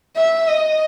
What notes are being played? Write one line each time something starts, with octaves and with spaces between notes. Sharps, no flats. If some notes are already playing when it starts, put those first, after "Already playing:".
E5
D#5